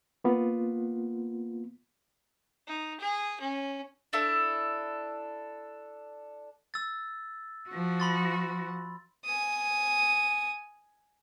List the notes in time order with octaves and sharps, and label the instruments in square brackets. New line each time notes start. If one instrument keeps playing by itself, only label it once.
[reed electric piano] A#3 B3 F4
[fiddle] D#4
G#4
C#4
[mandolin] D4 E4 A4
[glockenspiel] E6 A6
[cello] F3 F#4
[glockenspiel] B5 C6 A6
[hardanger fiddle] G#5 D#6